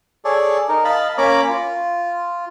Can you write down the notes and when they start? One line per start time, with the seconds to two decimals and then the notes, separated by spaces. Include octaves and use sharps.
0.25 G#4 A4 C#5 D5
0.69 D#4 A#4
0.85 D#5 F5 A5 B5
1.18 A#3 C#4 C#5 A#5 B5 D6
1.49 F4